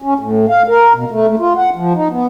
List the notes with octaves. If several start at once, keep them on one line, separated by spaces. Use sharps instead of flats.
C#4
A2
F5
A#4
B2
A3
A3
F4
F#5
F3
D#4
B3